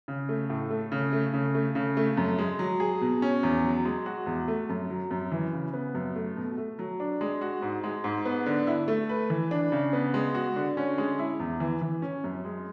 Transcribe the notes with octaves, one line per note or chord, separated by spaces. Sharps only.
C#3
A3
A2
A3
C#3
A3
C#3
A3
C#3
A3
F#2
G#3
F#3
G#4
B2
C#4
E2
F#3
G#3
F#4
E2
A3
F#2
F#3
F#2
E3
C#3
B3
F#2
A3
B2
A3
F#3
D4
G#3
F#4
G#2
G#3
G#2
B3
D3
E4
A3
B4
E3
D4
C#3
B3
G#3
F#4
D3
C#4
G#3
E4
E2
E3
E3
C#4
F#2
G#3